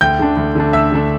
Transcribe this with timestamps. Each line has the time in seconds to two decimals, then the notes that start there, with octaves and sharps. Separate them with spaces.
0.01 D2 G5 G6
0.19 D3 A3 D4
0.37 D2
0.55 D3 A3 D4
0.73 D2 E5 E6
0.92 D3 A3 D4